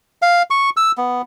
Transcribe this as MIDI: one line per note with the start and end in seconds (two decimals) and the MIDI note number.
0.22 0.42 77
0.50 0.70 85
0.77 0.92 88
0.97 1.22 59